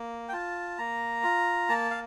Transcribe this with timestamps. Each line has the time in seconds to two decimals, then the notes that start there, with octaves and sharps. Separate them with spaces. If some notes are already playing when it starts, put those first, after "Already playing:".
Already playing: A#3
0.29 G5
0.33 F4 A5
0.78 A#3 A#5
1.23 F4
1.69 A#3 A5
1.91 F5